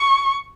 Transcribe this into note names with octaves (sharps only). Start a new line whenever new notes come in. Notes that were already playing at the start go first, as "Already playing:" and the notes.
Already playing: C#6